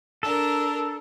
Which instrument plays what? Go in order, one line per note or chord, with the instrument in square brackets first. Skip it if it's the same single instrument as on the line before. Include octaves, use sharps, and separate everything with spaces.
[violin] D4 A#4 [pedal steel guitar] A4